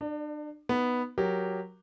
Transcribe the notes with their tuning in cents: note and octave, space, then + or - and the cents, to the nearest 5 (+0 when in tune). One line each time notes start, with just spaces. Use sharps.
D4 +35 D5 +0
B3 +0 D#4 +0
F#3 +0 G4 +0 A#4 +5